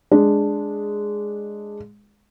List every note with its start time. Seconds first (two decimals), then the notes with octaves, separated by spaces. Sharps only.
0.11 G#3 D4